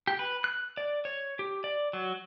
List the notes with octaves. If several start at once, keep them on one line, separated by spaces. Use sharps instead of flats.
G4
B4
F#6
D5
C#5
G4
D5
F#3